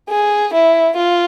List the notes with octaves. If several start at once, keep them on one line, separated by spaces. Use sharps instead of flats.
G#4
E4
F4